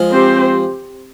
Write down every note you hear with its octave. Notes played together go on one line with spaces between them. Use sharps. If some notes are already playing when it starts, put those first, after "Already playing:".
Already playing: F3 G#3
C4 G4 C5